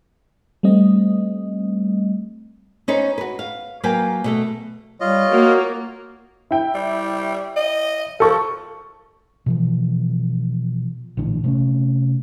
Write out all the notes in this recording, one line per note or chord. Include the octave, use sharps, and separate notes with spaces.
G3 A3 C4 D#5
C#4 D#4 B4 C5
F#4 B4
F5
F#3 A#3 B4 F5 G5 G#5
B2 A3 A4
G3 F4 C#5 D#5
A#3 F#4
E4 G5
G3
D#5
F3 A4 C#6
B2 E3 F3
A#1 A2 D3 E3
C3 A3 C#4